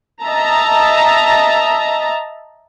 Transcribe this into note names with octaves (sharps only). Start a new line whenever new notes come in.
D#5 E5 A5 A#5